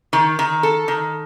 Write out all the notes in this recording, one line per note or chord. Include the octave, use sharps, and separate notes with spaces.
D#3
D#3
A4
D#3